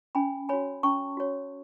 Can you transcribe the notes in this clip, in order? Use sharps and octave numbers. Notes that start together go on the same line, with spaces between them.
C#4 G#5 B5
F#4 C#5 G#5 B5
C#4 A5 C#6
F#4 C#5